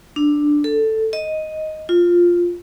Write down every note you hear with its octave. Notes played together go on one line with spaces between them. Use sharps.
D4
A4
D#5
F4